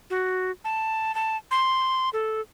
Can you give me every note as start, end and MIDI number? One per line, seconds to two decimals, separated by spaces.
0.10 0.51 66
0.65 1.15 81
1.15 1.37 81
1.51 2.09 84
2.13 2.41 69